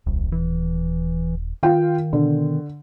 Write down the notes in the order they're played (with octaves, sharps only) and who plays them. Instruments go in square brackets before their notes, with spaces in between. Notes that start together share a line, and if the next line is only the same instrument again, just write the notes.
[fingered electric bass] D#1 [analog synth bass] C2
[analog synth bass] E3
[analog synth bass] D#3 [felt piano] F4 F5 G5
[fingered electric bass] B2 [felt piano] D3